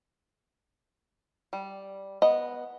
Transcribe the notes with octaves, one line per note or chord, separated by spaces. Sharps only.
G3
B3 D#5